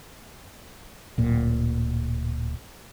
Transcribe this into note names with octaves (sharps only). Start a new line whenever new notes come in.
D1 A#2